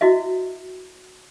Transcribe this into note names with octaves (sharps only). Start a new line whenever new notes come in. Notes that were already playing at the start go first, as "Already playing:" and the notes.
E4 F#4 D#5 E5